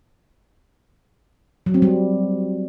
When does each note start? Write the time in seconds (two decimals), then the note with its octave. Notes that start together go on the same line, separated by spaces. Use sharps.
1.66 F#3
1.74 C4
1.82 G3